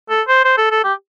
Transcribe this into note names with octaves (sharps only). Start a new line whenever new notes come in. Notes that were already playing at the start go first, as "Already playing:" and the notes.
A4
C5
C5
A4
A4
G4